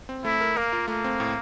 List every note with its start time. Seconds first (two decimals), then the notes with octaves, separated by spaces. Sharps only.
0.09 C4
0.25 A3 E4
0.41 A#4
0.57 A#3 A#4
0.73 F4
0.88 A3 A#3
1.04 C4
1.20 A2